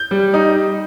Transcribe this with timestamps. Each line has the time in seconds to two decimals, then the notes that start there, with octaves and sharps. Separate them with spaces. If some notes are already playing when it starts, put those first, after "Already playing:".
Already playing: G6
0.11 G3
0.34 D#4